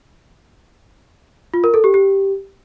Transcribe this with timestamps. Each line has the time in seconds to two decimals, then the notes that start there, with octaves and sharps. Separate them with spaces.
1.54 F4
1.64 A#4
1.74 A4
1.84 G4
1.94 G4